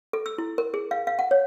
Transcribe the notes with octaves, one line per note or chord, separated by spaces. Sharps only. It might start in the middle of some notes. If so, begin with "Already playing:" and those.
A4
E6
E4
A#4
G#4
F5
F5
F#5
C#5